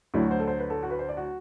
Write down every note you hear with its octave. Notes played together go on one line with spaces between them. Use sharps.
D2 D3 F#3 E4
F#4
C5
A4
C5
B4
A4
F#4
B4
C5
D5
F#4